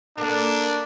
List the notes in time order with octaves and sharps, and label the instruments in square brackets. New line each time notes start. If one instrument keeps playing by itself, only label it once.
[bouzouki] A#3 A4 A#4 [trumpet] D4